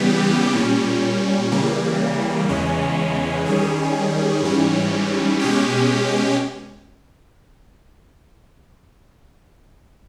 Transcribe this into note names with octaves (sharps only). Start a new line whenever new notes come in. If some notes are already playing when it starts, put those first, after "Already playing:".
Already playing: C#3 E3 G3 B3 G4
A#2 G3 C#4
C#3 E3 G3 A#3
E2 C#3 E3 G#3 C#4
D#3 G3 C#4 G#4
G#2 E3 G3 C#4
B2 G#3 C#4 G4